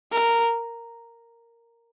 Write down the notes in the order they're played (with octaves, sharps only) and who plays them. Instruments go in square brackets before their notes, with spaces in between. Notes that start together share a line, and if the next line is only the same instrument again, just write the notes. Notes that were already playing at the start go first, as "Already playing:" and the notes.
[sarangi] A#4